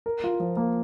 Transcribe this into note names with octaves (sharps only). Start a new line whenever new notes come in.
A#4
F4
F3
A#3